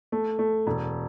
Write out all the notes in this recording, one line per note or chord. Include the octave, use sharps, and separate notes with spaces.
A3
A3
E1